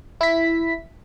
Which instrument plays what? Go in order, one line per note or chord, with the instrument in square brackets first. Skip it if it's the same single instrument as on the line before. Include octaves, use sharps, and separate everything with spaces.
[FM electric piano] E4 B6